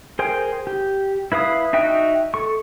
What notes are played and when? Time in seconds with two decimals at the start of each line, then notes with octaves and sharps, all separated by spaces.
0.19 G#4 A#4 C5 G5
0.67 G4
1.32 E4 B4 F5 D#6
1.73 D#4 F#4 E5 G5 F#6
2.34 A4 C#6